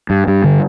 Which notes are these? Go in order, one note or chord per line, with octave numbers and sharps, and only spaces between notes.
G2
G2
D3